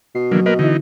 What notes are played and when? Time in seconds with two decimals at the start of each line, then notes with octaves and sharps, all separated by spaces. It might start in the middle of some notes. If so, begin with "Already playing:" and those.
0.15 B2 C7
0.31 D3 E3 F#3 A#3
0.46 A#3 A#4 B4 D#5
0.59 D3 E3 D#4 E4